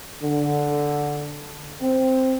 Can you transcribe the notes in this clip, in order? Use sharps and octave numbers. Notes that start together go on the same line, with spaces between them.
D3
C4